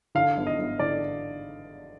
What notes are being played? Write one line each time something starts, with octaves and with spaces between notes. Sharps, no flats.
D3 F5
G1
D#5
G1
D3 D5